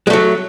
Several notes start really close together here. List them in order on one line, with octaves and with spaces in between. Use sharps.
G#3 A3 F#3